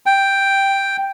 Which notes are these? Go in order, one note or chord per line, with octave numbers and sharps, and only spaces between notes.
G5